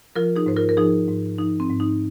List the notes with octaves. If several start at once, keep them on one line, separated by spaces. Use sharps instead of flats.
F3 F4 A#4
D#4 G#4
G#2 C5
F4 A#4
A#4
F3 D#4 G#4
G#2
F3 D#4
C4
G#2
D#4